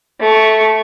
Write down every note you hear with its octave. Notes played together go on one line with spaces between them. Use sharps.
A3 C#6